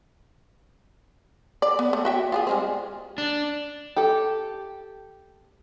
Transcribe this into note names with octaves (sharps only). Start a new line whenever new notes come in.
D5
B3
A3
F#4 E5 G5
F4 G4 G#4
G3 G#3 C4
D4
G4 A4